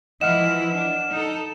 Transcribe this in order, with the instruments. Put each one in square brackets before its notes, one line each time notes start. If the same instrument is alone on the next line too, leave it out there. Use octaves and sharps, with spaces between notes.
[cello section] E3 F3 E4 [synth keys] D#5 F#5 F6 [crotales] E7
[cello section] D4
D#4 A4